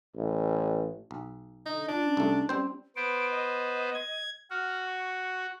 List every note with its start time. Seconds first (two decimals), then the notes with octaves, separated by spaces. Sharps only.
0.15 A1
1.11 B1
1.66 D3 D#4
1.88 D4 F4
2.04 C#4
2.17 C2 A3
2.49 G3 C4 C#4 C5
2.96 B3 C5 D7
3.31 D#5
3.94 G#6
4.50 F#4 F6
4.86 C#6